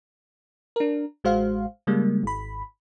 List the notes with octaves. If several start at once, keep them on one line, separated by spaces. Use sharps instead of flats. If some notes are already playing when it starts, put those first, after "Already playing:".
D4 A#4
A1 G#3 F#4 C5 F5
C#3 G3 G#3 A#3
G#1 B5